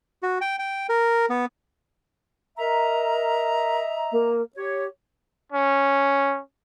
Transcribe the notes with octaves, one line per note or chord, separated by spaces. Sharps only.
F#4
G5
G5
A#4
B3
A#4 D#5 E5 A#5
A#3
G4 C#5
C#4